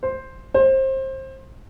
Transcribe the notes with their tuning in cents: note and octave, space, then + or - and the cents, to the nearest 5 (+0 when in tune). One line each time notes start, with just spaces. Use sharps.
C5 +5
C5 +25